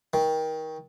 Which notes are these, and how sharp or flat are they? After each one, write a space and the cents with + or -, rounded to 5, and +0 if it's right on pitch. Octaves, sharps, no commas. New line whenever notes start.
D#3 +25